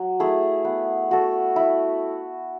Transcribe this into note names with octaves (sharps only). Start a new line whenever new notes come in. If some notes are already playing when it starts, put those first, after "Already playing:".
Already playing: F#3
A3 E4 G#4
B3
F#4 A4
E4